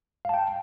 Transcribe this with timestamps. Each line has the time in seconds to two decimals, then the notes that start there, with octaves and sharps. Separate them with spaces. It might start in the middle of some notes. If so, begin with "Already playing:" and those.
0.25 F5
0.29 A5
0.34 G5